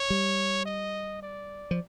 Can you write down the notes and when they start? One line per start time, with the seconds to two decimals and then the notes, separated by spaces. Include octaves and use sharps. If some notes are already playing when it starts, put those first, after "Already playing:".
Already playing: C#5
0.10 G3
0.66 D#5
1.23 D5
1.71 F3